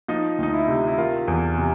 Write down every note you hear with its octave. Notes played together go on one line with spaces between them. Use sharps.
F3 D#4
D2 D#4
E4
C3
E4
D#3 F4
E2
C3